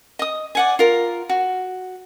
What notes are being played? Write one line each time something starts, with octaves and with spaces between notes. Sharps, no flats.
D#5 D#6
D5 F#5 G#5
F4 A#4
F#4